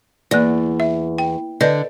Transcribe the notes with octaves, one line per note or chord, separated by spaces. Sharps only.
E2 A#3 D5
E5
G5
D3 B4 D5 D#5